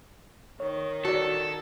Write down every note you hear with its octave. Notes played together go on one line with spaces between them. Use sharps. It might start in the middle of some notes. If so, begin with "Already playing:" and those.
D#3 C#5
F#4 A4 D5